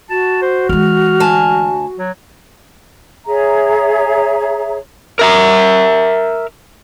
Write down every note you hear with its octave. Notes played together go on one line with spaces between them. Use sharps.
F#4 A5
C5
E3 G#3 F6
D2 G#5 A5
F#3
G#4 C#5 E5 A#5
A#4 E5 A#5